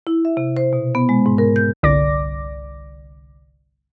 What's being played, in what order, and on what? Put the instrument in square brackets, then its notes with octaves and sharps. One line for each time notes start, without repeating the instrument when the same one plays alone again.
[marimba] E4
E5
C3
C5
B2
B3
G#3
G#2
A#4
G6
[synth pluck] G1 C2 D3 D5 D6 A#6